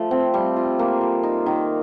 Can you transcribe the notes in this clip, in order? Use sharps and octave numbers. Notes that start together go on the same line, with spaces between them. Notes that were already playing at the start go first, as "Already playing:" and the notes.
Already playing: F3 A3
C4
G3
F4
A#3
F3
D#4
D#3